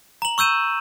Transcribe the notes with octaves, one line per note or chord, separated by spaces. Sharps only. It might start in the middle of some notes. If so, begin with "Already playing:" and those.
A#5 F#7
C#6 E6 G6 D#7 E7